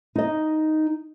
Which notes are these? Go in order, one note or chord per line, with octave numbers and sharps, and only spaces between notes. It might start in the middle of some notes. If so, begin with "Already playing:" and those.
D#4 D#5